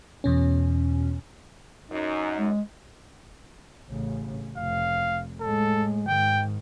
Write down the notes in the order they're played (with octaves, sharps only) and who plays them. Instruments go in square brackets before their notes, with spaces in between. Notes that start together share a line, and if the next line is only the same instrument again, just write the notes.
[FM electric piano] E2 B2 C#4
[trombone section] F#2 [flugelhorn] D#4
[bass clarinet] G#3
[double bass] A1 C#3
[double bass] F1 [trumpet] F5
[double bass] A2 G#3 [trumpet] A4
[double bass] G#2 D#3 [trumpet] G5